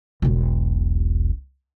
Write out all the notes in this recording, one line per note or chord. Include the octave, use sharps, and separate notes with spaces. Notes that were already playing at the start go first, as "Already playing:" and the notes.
E1 B1